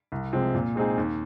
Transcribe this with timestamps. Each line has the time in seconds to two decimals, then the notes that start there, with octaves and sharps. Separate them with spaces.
0.12 C2
0.33 C3 F3 G#3 C4
0.54 A#2
0.75 G#3 C4 D#4 G#4
0.98 D#2